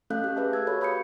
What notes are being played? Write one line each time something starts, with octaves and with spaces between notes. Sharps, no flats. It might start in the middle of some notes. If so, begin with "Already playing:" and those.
A3 C#4 A4 F5 F#6 G6
G4
G#4 B4 E5 A5
G4 G#4 E6 G#6
F#4 A4 C#5 B5
F5 B5 D#6 G6 G#6 C#7